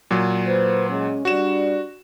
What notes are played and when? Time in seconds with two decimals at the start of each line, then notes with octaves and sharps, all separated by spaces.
0.11 A#2 F#3
0.46 A#3 B4 C5
0.89 G#3 C#4
1.25 G3 D4 F#4 E7